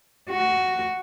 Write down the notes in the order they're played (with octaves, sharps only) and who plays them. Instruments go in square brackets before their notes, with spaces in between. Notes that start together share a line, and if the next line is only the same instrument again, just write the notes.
[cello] F#4